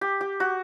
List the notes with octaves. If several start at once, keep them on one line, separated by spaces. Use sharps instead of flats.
G4
G4
F#4